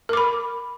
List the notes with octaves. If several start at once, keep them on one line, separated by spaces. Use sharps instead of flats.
A#4 B5 D6